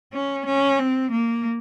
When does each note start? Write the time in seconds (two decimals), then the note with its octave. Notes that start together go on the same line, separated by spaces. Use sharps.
0.13 C#4
0.46 C#4
0.79 C4
1.11 A#3